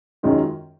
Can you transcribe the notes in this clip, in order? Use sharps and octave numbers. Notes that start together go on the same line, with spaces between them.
F#2 D#3 G#3 C#4 F4